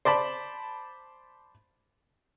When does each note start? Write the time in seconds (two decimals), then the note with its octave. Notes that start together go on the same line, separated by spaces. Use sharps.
0.05 C5 D5 A5 B5